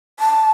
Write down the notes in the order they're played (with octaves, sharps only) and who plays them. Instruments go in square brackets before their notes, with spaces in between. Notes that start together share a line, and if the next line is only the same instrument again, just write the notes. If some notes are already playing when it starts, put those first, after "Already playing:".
[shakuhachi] A5